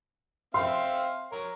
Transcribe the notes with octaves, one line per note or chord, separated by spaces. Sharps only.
C4 E5 F5 C6
A#4 C#5